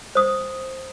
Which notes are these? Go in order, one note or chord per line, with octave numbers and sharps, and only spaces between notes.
C5 D#6